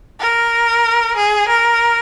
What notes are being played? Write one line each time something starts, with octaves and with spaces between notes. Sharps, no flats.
A#4
G#4
A#4